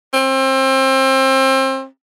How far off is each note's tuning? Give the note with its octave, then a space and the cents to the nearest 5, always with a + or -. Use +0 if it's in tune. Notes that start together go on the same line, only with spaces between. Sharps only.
C4 +30